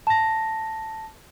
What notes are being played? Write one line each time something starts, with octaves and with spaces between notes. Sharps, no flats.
A5 A#6